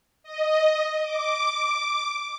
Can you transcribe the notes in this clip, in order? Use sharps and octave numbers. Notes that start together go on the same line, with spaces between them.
D#5
D6